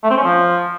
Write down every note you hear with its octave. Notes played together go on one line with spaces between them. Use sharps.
A3
C4
C#4
F3